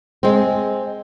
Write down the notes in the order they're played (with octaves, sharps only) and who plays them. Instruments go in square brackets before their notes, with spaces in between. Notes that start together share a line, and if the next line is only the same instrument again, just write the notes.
[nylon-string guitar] G#3 C4